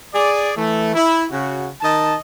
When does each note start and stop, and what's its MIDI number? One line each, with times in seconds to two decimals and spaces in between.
0.13 0.51 68
0.13 0.51 74
0.57 0.94 52
0.57 0.94 57
0.94 1.25 64
1.31 1.68 49
1.31 1.68 66
1.81 2.15 51
1.81 2.15 75
1.81 2.15 81